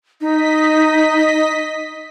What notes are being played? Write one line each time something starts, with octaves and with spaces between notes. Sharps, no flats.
D#4 D#5 B6